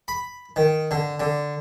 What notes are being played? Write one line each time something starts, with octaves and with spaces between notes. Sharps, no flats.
B5
D#3
D3
D3